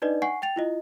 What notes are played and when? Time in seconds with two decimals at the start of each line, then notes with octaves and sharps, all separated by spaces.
0.02 D4 D#4 B4 D5 D#5
0.22 F#5 G#5 C#6 C7
0.42 G5 A6 F7
0.56 E4 F4 D#5